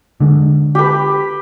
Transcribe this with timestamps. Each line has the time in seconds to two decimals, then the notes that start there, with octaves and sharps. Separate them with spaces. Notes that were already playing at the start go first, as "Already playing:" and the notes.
0.20 D3 G#3
0.75 G4 B4